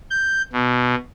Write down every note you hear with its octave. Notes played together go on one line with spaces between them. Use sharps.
G6
B2